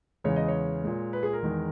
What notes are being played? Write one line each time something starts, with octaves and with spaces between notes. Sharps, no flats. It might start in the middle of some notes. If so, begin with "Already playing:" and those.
E2 C#3 E3 G#3 C#5
D#5
C#5
A#2 G#3
B4
G#4
A#4
E2 D#3 G#3